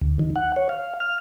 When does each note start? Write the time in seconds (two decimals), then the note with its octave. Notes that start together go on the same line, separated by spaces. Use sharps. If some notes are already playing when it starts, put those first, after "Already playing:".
0.01 D2
0.19 D#3
0.36 F#5
0.56 C#5
0.69 F5
1.00 F6